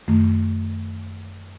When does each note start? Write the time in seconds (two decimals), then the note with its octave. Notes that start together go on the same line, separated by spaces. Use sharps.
0.08 F#2 D#3 A3